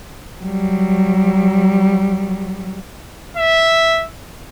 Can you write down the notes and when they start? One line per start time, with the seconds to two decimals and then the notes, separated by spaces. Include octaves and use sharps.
0.40 F#3 G3
3.37 E5